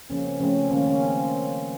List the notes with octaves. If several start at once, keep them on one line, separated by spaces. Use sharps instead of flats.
C#3 F3 A#3 C#4
C4
C#3 F3 A3 C4 C#4
D#3 A#3 C#4
C#4
C4